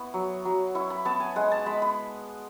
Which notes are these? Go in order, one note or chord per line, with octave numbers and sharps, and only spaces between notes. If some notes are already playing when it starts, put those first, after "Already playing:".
Already playing: B3 E4 C#6
F#3
F#3
E4 C#6
B5
B3 A5
G#5
G#3 F#5
A5
G#3 B5
B5